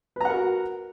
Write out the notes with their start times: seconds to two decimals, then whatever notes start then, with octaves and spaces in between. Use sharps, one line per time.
0.16 B4
0.21 A#5
0.25 F#5
0.30 A#4
0.34 F#4